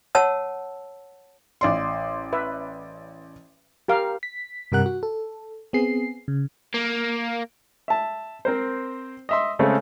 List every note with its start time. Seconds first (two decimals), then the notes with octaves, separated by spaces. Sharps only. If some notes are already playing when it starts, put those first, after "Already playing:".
0.15 C#5 F#5 A5 E6
1.61 A1 D5 C6
2.33 B4 E5
3.88 G4 A#4 F5
4.23 B6
4.72 G2 C3 G3 A#4 F#5 F#6
4.86 F#4
5.03 A4
5.73 B3 C4 G#4 C7
6.28 C#3
6.74 A#3
7.88 E5 A5
8.45 C4 A#4 C5
9.29 D#5 E5 C6
9.59 C#3 G#3 A3 C4 C#4